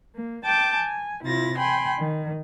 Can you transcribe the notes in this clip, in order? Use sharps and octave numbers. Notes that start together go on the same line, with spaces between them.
A#3
G5 A5 D6 G6
G#5
C3 E4 F4 A6 A#6
G5 G#5 B5 C6
D#3